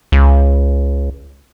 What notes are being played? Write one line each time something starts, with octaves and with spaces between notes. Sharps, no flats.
C#2